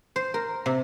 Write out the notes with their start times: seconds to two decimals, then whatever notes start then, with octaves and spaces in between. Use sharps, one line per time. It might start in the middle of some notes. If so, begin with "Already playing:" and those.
0.16 C5
0.34 A#4
0.66 C3